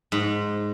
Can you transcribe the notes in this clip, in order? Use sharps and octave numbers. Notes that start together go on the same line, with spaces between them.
G#2